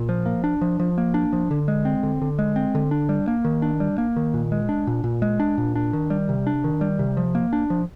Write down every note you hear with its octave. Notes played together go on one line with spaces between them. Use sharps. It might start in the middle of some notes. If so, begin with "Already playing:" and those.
Already playing: A#2
F3
A#3
D4
F3
F3
A#3
D4
F3
D3
G#3
C4
D3
D3
G#3
C4
D3
D4
G3
A#3
D#3
D4
G3
A#3
D#3
A#2
G#3
D4
A#2
A#2
G#3
D4
A#2
D4
D#3
G3
C3
D4
D#3
G3
C3
F3
A#3
D4
F3